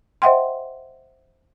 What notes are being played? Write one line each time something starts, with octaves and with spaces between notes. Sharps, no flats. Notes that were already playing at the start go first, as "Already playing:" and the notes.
C5 D#5 E5 F#5 G5 C6